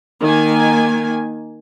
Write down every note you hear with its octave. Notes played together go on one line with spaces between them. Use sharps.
D#3 A#3 G#5